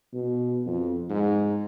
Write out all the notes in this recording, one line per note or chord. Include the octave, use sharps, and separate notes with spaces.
B2
F2
G#2